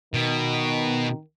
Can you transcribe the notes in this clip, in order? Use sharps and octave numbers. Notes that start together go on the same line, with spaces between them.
B2 D#3